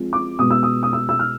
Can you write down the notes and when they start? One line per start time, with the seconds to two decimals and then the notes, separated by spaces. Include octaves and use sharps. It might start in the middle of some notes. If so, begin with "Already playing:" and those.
Already playing: F3 G#3 C4
0.13 D6
0.39 B2 G#3 B3 D#6
0.51 E6
0.63 D#6
0.83 D#6
0.93 E6
1.09 E6
1.19 F6